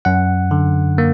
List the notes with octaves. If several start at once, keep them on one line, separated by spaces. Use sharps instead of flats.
F#2 F#5
D3
A#3